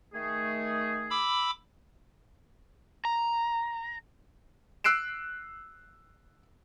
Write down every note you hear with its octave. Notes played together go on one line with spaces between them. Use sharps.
D#3 A3 G#4
B5 D6 E6
A#5
E6 F#6 C7 D7 E7